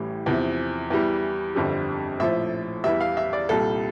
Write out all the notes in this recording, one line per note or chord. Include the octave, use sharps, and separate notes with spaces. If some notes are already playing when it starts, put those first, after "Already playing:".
Already playing: A1 A2 E3 G3
E2 C3 F3
E2 E3 G3
G1 F2 D3 G3
A#1 A2 F3 E5
E2 E3 G3 E5
F5
E5
D5
C2 A#2 G3 A4